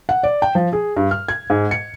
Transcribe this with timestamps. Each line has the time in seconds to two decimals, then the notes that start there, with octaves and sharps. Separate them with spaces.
0.09 F#5
0.23 D5
0.42 G5
0.55 F3
0.73 G#4
0.97 G2
1.11 F6
1.28 G#6
1.50 G#2
1.71 C#7